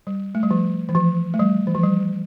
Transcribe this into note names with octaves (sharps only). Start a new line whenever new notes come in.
G3
A3
G3
F3
E3
F3
A3
G3
E3
F3
G3